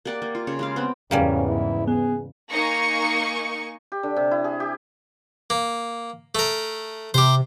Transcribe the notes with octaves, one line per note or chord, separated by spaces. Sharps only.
A#3 G4 D5 F#5
A#3
F4
C#3 C#5
G#3 G4 F5
B3 C4 G5
E2 G#2 C#3 G3 A#3 C#4
E4
B3 G#4
A#3 D#4 G#5 C#6 C#7
G4
D3
C3
E4
G#4
G4
A#3
A3 A#4
C3 G4 C5